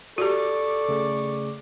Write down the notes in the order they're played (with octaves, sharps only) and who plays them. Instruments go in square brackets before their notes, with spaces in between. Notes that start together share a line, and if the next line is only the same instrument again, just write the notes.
[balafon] F#4 G4 [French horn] A4 [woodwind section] D5 C#6 D6
[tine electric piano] C#3 A3 G#4